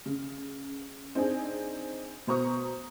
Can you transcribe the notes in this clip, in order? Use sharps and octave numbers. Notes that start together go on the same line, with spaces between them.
C#3
C4 D4 D#4 G#4
B2 C5 A#5 C#6 D#6